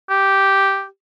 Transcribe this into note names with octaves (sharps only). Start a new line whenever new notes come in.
G4